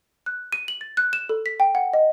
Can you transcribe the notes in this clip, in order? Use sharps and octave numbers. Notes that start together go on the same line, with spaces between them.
F#6
D#7
F#7
A6
F#6
E7
A4
B6
G5
F#5
D#5